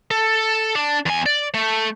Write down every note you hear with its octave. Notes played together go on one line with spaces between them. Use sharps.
A4
D4
E2 G#5
D5
A3